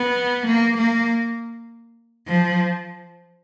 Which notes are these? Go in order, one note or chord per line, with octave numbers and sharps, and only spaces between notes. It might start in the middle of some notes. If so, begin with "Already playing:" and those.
Already playing: B3
A#3
A#3
F3